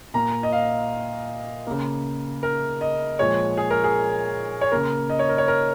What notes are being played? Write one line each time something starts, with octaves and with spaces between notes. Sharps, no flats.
A#2 A#3 A#5
D#5
F5
C#3 A#3
A#4
D#5
A#2 F3 G#3 C#5
G#4
A#4
G#4
C#5
C#3 A#3 A#4
D#5
C#5
A#4
C#5
A#4